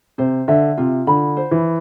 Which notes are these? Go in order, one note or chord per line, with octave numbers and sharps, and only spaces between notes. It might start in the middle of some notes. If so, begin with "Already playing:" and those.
C3 C5
D3 E5
C3 F4
D3 B5
C5
E3